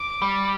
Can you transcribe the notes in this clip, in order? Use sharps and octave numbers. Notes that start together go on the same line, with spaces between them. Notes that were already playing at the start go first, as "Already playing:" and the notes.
Already playing: D6
G3